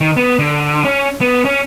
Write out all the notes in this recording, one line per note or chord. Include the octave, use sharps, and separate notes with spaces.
D#3
B3
D3
C#4
B3
C#4